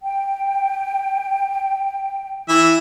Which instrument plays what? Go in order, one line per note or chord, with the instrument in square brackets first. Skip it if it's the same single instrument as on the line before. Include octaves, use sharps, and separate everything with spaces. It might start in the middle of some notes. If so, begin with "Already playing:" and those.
[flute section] G5
[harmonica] E3 E5